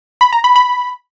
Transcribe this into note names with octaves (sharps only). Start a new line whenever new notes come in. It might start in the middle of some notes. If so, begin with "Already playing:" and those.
B5
A#5
B5
B5